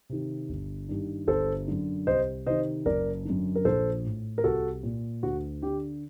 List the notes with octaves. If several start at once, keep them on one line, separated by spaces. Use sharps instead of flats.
C3 D#3
G1
G2 D#3
G1 A4 C5
F#2 D3
C2 C5 D#5
C3 D#3 C5 D#5
F#1 A#4 D5
F#2 D3
A#4
A#1 A4 C5
A2
A#4
C2 F#4 A4
A#2
D2 F#4
D3 G4